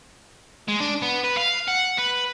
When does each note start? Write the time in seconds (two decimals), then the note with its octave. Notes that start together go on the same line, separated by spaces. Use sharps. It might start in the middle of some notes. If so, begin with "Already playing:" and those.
0.68 G#3
0.80 D4
1.02 B3
1.24 B4
1.37 F5
1.68 F#5
1.98 B4